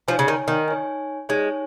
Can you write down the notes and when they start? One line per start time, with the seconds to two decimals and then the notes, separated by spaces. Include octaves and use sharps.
0.08 F3 D#4 C#5 G#5
0.19 C#3
0.28 D#3
0.48 D#3
0.68 D#4 C#5 G#5
1.29 G#3 D#4 C#5 G#5